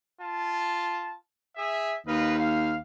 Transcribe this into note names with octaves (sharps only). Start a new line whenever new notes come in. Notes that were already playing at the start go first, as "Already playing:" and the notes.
F4 A5
G#4 E5
D#2 B4 D#5 F5
F5